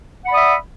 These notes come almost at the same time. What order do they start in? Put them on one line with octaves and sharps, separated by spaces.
F#5 B5 D5 D#6 E5